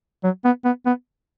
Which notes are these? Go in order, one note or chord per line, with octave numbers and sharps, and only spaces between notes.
F#3
B3
B3
B3